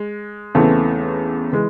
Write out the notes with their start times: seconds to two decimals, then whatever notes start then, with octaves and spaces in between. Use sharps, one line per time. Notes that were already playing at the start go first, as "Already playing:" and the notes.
Already playing: G#3
0.55 E2 C#3 E3 A3 C4
1.53 E3 G#3